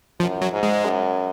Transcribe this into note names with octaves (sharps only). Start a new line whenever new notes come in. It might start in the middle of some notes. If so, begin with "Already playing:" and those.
F#2 F3
F#3
G#2
G#3
F#2